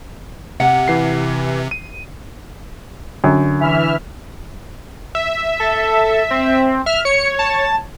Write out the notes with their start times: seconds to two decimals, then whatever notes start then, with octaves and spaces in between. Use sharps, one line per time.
0.60 C3 F#5
0.88 E3 C7
1.71 D#7
3.24 F#2 D3
3.60 E3 E5 F6
5.15 E5
5.60 A4
6.30 C4
6.86 E5 F6
7.05 C#5 C#7
7.39 A5